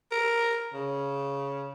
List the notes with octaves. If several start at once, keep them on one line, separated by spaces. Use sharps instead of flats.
A#4
C#3